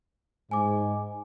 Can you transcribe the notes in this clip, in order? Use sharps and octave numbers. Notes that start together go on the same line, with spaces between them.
G#2 G#5 D6